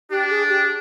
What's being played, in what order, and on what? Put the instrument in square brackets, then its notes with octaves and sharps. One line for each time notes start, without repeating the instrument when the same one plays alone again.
[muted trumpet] D4 [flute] G4
[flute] G#4
G4